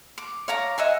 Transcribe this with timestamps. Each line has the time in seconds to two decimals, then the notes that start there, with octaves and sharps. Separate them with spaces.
0.18 D6
0.48 C#5 F5 A#5 D6
0.78 D#5 E5 F#5 G#5